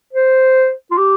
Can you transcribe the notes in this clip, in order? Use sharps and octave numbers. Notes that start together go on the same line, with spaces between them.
C5
F4
G4